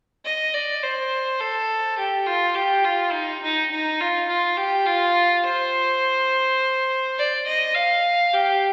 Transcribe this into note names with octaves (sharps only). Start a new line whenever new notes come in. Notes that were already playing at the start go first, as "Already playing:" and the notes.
D#5
D5
C5
A4
G4
F4
G4
F4
D#4
D#4
D#4
F4
F4
G4
F4
C5
D5
D#5
F5
G4